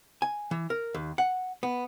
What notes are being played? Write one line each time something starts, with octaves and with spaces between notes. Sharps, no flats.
G#5
E3
A#4
D#2
F#5
B3